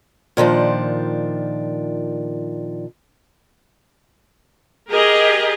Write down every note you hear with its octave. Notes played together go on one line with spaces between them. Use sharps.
A#2 D#3 F3 D4
G4 G#4 A#4 D#5